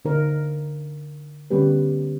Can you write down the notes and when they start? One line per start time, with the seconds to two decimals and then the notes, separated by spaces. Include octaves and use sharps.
0.05 D3 D#4 A#4 C5
1.51 D3 G3 B3 C#4 G4 B4